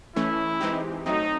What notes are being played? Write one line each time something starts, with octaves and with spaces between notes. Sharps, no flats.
E3 A3 C#4 E4
E3 G#3 C4 D#4 G4
F#3 A3 C4 D#4